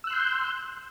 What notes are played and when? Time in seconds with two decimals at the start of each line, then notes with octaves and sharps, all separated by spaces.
0.04 E6
0.07 F#6
0.10 C6
0.13 G6